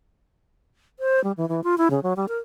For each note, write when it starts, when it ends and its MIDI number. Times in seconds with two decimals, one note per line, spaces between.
0.99 1.22 72
1.24 1.32 55
1.37 1.48 52
1.49 1.61 52
1.64 1.78 65
1.78 1.88 64
1.91 2.00 49
2.03 2.13 54
2.16 2.26 55
2.28 2.37 70